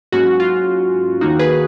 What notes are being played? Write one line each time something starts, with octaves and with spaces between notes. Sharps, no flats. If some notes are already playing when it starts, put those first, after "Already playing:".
G#2 F#3 A#3 C#4 F#4
F4
D#2 D#3 A#3 D#4 F#4
G#4 B4